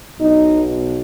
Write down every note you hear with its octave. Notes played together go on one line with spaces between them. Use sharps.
B1 B2 D#4